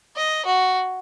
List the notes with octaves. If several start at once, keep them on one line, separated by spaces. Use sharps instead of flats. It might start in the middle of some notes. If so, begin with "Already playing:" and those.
D#5
F#4